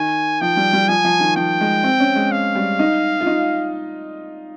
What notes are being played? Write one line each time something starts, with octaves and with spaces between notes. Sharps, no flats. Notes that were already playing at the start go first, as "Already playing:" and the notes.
Already playing: D#3 G#5
F3 G5
G3
G3
F3 G#5
F3
D#3
F3 G5
G#3
C4
C#4
G#3
F5
G3
D#4
F4
D#4